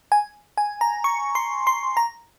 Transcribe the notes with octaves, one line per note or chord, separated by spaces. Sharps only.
G#5
G#5
A#5
C#6
C6
C6
A#5